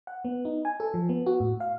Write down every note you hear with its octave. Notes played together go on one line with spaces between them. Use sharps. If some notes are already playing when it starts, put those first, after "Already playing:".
F#5
B3
D#4
G#5
A4
F3
B3
F#4
A2
F5